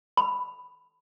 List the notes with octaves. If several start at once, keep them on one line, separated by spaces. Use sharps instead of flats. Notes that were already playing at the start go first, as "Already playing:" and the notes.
B5